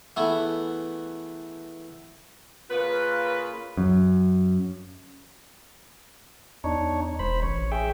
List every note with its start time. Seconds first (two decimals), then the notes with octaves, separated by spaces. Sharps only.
0.16 E3 A3 B3 G#4
2.70 C#3 A#3 F4 B4
3.77 F#2
6.64 E2 D4 D#4 C#5
7.19 E1 C5 B5
7.42 A1 C#5
7.72 G#4 E5 G5